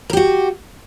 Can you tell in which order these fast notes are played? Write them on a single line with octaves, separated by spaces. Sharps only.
A#4 G4 F#4